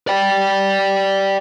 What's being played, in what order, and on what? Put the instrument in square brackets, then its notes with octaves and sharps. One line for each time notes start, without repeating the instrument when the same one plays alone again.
[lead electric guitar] D5 G5